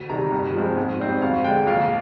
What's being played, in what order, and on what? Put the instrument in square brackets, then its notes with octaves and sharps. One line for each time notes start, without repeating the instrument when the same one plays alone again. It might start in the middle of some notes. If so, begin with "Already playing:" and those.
Already playing: [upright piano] D2
C3 D#3 G3 A#5
G2
F3 G#3 C4
G#2
G3 C4 D#4
D2 F5
D3 G#3 G5
A#1 F5